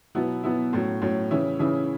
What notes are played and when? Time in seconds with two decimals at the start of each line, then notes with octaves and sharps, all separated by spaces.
0.15 B2 F#3 B3 E4
0.43 B2 F#3 B3 E4
0.73 A2 F#3 C#4
1.02 A2 F#3 C#4
1.31 C#3 E3 C#4 E4
1.59 C#3 E3 C#4 E4